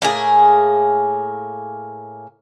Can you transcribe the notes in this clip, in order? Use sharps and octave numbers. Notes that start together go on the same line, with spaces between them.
A2 A#3 G#4